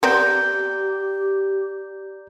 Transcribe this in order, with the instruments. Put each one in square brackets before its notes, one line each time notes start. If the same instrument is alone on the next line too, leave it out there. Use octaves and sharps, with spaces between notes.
[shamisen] B3 C4 [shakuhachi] G4 [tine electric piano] D5 A#5 G6